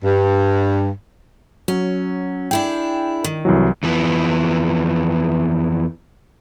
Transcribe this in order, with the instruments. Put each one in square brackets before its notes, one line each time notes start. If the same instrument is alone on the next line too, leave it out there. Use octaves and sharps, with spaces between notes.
[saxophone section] G2
[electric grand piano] F#3 [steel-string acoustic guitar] C#4
[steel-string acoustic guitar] D4 E4 G#4 [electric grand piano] G5
[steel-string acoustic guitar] D#3
[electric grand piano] C2 E3 F#3
[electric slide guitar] F2 E3 F3 B3